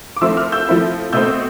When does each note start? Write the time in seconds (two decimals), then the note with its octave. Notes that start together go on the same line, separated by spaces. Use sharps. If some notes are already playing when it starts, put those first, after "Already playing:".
0.16 D6
0.21 F3 A3 C4 E4 C6 E6
0.37 D6 F6
0.52 E6 G6
0.67 F3 A3 C4 E4
1.13 B2 A3 C4 E6 G6